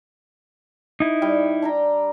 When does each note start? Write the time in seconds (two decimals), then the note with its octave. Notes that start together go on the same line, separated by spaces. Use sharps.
1.00 D#4 E4
1.22 G3 G5
1.62 D4 G5 A#5